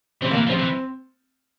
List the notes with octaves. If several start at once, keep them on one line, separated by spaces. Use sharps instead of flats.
E3 C4
A#3
E3
F3 C4
E3